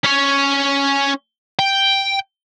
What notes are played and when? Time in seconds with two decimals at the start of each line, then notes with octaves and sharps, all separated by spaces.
0.04 C#4 C#5
1.59 G5